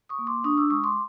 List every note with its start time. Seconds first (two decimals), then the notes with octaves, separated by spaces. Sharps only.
0.09 C#6 D#6
0.19 A#3
0.27 C6 D6
0.44 D4 C#6 D#6
0.57 D6 E6
0.70 G#3 C#6 D#6
0.84 C6 D6